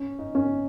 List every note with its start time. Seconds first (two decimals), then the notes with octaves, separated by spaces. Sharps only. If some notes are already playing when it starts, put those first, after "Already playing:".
Already playing: C#4
0.19 D#4
0.35 C#4